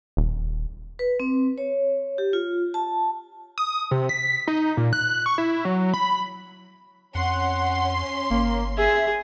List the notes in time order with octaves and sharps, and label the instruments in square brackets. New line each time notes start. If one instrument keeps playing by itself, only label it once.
[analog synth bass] D#1
[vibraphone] B4
C4
C#5
G4
F4
A5
[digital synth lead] D#6
C3
B6
D#4
A#2
F#6
C#6
E4
F#3
B5
[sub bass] F2 [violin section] C#4 C6 [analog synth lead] F#5
[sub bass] G1 [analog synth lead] A#3
[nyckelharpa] G#4 [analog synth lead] E5